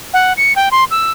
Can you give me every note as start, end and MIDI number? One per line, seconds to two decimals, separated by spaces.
0.14 0.33 78
0.37 0.53 97
0.56 0.69 79
0.71 0.84 84
0.91 1.11 88